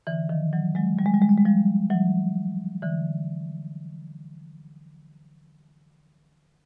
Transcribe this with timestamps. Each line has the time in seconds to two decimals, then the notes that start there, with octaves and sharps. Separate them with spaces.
0.07 D3 E3
0.29 D#3 F3
0.53 E3 F#3
0.75 F#3 G#3
0.99 G3
1.06 G#3
1.14 G3
1.22 G#3
1.29 G3
1.37 G#3
1.45 F3 G3
1.90 E3 F#3
2.82 D3 E3